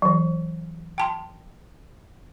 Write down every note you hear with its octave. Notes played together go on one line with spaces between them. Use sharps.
E3 F#3
G5 A5 C6